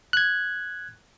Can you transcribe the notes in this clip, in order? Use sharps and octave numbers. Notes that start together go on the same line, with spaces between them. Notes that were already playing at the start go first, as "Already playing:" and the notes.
F#6 G#6